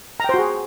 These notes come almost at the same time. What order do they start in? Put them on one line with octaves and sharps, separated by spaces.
A#5 G5 C5 F#4 G#4